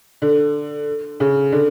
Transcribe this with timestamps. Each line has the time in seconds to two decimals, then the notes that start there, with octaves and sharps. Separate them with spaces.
0.22 D3
1.20 C#3
1.52 D3